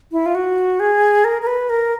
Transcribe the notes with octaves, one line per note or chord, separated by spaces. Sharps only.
E4
F4
F#4
G#4
A#4
A#4
B4
A#4